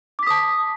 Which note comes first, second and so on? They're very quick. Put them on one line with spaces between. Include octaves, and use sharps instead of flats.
D6 B6 D#6 A5